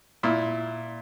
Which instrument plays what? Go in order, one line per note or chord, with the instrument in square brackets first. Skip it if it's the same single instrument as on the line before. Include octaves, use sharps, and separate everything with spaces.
[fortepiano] A#2 E4